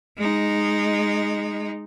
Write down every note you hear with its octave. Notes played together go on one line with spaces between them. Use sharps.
G#3 D#4